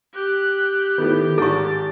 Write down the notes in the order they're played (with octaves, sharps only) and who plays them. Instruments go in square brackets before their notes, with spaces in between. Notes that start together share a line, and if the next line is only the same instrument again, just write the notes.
[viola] G4 [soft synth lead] F#6
[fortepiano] A2 A3 B3 [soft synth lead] D#3
[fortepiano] G#1 G#2 D3 [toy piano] G#4 C#6 [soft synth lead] A6